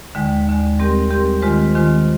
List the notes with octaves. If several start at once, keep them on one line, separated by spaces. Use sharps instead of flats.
D#2 D3 G#3
D#2 D3 G#3
G3 C4 G4 A#4
G3 C4 G4 A#4
D#3 G#3 C4 F4 C5
D#3 G#3 C4 F4 C5